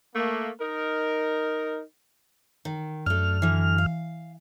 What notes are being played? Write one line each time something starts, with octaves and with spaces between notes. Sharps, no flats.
A3 A#3
D#4 A#4
D#3
F#2 A3 D4 F6
D3 E3
F5